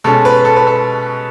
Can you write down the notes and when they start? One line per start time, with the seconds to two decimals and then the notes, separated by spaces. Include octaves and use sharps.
0.04 B2 G#3 C#4 A4
0.25 B4
0.45 A4
0.56 B4
0.67 A4